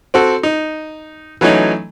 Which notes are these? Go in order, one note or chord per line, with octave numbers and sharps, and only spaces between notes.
C4 F#4 A4
D#4
E3 F#3 A3 C#4 D#4